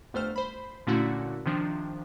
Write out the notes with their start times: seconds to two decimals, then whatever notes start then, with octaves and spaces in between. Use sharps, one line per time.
0.13 G1 F2 A3 C5 F6
0.36 C5 B5
0.87 A#2 D3 A3 C#4 E4 F#4
1.46 C3 D#3 F3 D4